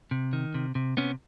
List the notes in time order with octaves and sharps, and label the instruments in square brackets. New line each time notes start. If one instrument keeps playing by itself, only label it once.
[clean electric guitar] C3
D#3
C3
C3
C3 B3 C#4